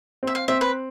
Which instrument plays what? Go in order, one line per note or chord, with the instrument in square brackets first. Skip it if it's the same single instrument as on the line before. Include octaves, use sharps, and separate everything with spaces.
[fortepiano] C4 [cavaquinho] E5
[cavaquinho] F5
[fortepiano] C4 [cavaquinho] E5
[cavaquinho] B4